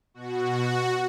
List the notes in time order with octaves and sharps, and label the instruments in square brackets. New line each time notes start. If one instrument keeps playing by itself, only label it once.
[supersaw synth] B2 F#4